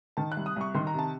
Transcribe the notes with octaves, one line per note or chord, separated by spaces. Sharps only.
D#3 A5
C2 F#6
D#6
C2 C#6
D#3 C6
A#5
C3 A5